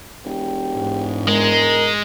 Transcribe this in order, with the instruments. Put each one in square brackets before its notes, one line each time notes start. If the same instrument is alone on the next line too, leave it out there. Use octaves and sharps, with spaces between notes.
[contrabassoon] E1 [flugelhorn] G4
[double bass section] G#2
[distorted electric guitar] G#3 [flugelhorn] A#4